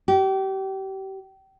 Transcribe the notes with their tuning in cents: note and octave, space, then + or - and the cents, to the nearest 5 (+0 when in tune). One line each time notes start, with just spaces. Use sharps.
G4 -30